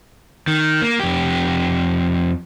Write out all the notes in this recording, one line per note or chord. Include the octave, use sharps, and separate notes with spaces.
D#3
A#3
F2 G4